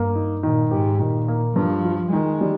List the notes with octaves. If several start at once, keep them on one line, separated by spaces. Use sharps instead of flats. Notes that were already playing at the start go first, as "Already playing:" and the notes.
Already playing: G2 A#3
D#4
A#2 D#3
G#2 G4
A#2 D#3
A#3
G2 F3
F4
D#3 G#3
G3